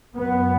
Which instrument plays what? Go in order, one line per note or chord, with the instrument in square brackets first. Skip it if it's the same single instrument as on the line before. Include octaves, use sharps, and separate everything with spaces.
[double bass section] F#2 B3